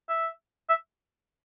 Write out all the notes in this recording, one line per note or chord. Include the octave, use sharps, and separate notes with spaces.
E5
E5